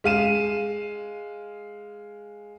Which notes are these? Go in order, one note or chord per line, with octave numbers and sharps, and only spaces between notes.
G#3 F5 D#7 E7